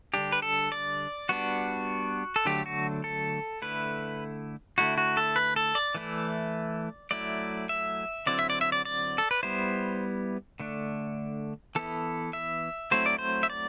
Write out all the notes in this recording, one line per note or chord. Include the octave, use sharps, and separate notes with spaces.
D3 G3 D4 G4
B4
A4
D5
G3 B3 D4 F#4
A4
D3 F#3 A3 D4 G4
F#4
A4
D3 A3 E4 B4
D3 A3 E4 F#4
F#4
A4
B4
A4
D5
E3 A3 E4
F#3 A3 E4 D5
E5
D3 F#3 C4 E4 D5
E5
D5
E5
D5
D5
A4
B4
G3 B3 E4 C5
D3 A3 D4
E3 B3 E4 A4
E5
F#3 A3 C4 E4 C5
D5
C5
E5
D5